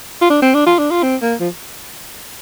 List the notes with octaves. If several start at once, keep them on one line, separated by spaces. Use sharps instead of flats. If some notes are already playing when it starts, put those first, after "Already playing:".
F4
D4
C4
D4
F4
D4
F4
C4
A#3
F3